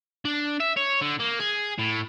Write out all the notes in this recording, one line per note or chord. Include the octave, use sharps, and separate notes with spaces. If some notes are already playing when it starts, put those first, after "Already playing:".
D4
E5
C#5
D3
A#3
G#4
A2